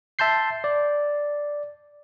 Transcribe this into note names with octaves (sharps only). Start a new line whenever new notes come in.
E5 A5 C6 G6 C7
D5